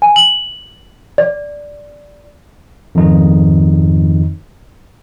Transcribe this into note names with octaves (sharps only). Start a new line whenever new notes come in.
G#5
F#7
D5
F2 G#2 D#3 D#4